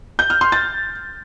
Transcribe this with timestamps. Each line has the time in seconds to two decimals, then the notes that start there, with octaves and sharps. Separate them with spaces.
0.19 G6
0.30 F6
0.41 C6
0.52 A6